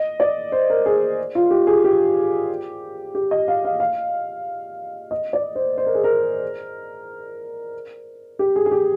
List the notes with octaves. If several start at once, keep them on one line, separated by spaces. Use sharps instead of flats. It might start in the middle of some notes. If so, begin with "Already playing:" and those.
Already playing: D#5
D5
C5
A#4
G#4
F4
G4
G#4
G4
G4
D#5
F5
F5
F5
D#5
D5
C5
C5
A#4
G#4
A#4
G4
G#4
G#4
G4